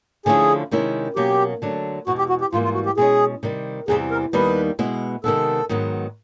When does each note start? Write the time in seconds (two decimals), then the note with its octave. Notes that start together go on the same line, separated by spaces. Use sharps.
0.26 D3 F3 A3 C#4 E4 G#4
0.71 C3 D#3 G#3 C#4 E4
1.16 B2 F#3 A#3 C#4 G4
1.62 D3 F#3 A3 D4
2.07 E2 B2 G#3 F#4
2.18 G4
2.29 F#4
2.41 G4
2.53 G#2 E3 G3 A#3 F4
2.64 F4
2.74 F#4
2.86 G4
2.97 B2 G#3 C#4 G#4
3.43 C3 D#3 G3
3.88 E2 C3 E3 G3 C4 G#4
4.11 A#4
4.33 D#2 D#3 G3 B3 D#4 B4
4.79 B2 G#3 B3 E4
5.24 C3 D#3 G#3 B3 A4
5.69 G#2 D#3 F#3 B3